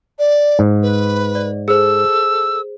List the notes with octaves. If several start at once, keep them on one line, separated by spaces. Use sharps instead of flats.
D5
G#2
B4
D5
G#4 A4 C5 E6